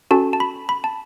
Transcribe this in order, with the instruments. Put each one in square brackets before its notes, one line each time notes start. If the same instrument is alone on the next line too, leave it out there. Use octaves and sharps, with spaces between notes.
[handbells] C#4 F#4 A4 A5
A5
B5
B5
A5